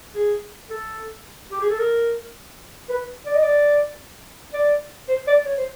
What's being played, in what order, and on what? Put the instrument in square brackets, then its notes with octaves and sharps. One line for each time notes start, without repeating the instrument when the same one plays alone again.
[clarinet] G#4
A4
G4
G#4
A4
A#4
B4
D5
D#5
D5
D5
C5
D5
C#5
C5